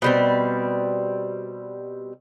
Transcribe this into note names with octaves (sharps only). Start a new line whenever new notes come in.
B2 G3 C4